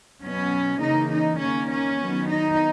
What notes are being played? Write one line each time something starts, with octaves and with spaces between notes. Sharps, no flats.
B2 F#3 B3 C#4
C#3 E3 A#3 D#4
D#4
D#3 A#3 C#4
C#4
D#3 F#3 B3
D#4